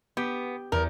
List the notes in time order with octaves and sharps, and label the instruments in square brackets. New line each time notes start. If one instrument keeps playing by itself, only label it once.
[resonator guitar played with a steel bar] B3 [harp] G4
[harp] E2 [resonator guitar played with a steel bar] A#4